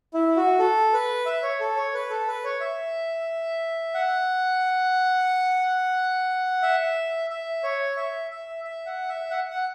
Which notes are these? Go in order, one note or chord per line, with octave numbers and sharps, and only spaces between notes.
E4
F#4
A4
B4
E5
C#5
A4
C#5
B4
A4
B4
C#5
E5
F#5
E5
E5
C#5
E5
E5
E5
F#5
E5
F#5
F#5